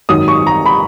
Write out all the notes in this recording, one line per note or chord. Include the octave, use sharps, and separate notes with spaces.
G#1 F#2 D#3 F#3 D#6
C#6
A#5
B5